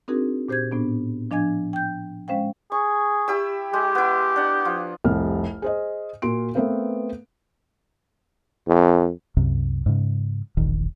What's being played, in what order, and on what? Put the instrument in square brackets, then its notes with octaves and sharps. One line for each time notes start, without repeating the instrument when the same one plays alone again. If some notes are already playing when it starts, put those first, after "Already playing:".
[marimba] C4 D4 D#4 F#4 G#4 A#4
A#2 G4 C5 G6 G#6
A2 B3 D4
F3 D4 D#5 G#5 G#6
G5 G6
G#3 C#4 C5 F5 G5
[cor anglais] G#4 [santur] C#6
[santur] E4 G4 E6
[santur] G#3 [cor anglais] G4
[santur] B3 E4
D4 F#5
F3
[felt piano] F1 C2 F6
G#4 C5 D#5
A#2 F#4 C6 D7
A3 B3 C4 A#4 B4 F5
[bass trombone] F2
[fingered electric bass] C2 F#2 C3
G#2 C#3
E1 A#1 D#3